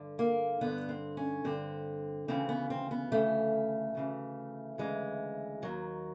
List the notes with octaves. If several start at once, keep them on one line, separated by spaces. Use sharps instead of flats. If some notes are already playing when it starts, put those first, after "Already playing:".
Already playing: G2 D3
A#3
G2 D3 B3
C4
C#4
G2 D3 C4
D2 C#3 E3 C4
B3
C4
B3
D2 C#3 E3 A3
D2 C#3 E3
D2 C#3 E3 G#3
D#2 D#3 F#3